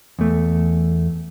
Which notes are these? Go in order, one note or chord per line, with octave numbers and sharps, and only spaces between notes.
E2 A3